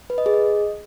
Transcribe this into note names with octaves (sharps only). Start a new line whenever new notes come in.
B4
D#5
G#4
D#5